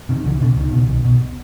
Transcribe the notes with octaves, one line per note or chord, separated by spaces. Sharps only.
C3 D#3
C#2 D3 E3
B2 D3
C#2 D#3
B2
B1
B2